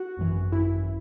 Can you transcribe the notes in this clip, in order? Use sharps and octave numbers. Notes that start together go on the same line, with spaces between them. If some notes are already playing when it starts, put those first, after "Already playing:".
Already playing: F#4
G#1 F#2 E3
G#1 F#2 E3 E4